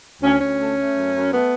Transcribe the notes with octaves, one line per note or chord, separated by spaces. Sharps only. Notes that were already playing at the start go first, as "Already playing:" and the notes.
D2 C#4
D2 C#4
A3
A3
F#2
F#2
A3 B3